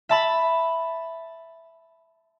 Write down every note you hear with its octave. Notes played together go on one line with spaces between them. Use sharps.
E5 A5 B5